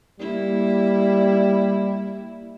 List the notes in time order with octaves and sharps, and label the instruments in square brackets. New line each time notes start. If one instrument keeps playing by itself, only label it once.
[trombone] G3 [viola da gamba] A#3 E4